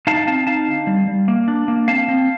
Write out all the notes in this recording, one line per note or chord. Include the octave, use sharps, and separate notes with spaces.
D#4 F5 A5
C4 F5 A5
D#4 F5 A5
D3
G3
G3
A#3
D4
A#3
C4 F5 A5
C4